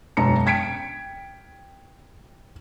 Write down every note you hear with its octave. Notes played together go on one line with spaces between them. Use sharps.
E1 F#2 A5 A#5 C#7
G5 G#6 B6 C#7 D7